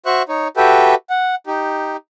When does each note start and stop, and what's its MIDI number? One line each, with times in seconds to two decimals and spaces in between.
0.06 0.23 66
0.06 0.23 72
0.06 0.23 76
0.06 0.23 85
0.06 0.23 90
0.29 0.48 63
0.29 0.48 73
0.57 0.95 66
0.57 0.95 67
0.57 0.95 69
0.57 0.95 71
0.57 0.95 76
0.57 0.95 79
1.10 1.35 78
1.47 1.97 63
1.47 1.97 67